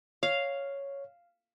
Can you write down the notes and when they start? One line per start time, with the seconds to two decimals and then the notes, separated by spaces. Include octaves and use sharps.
0.23 C#5 F5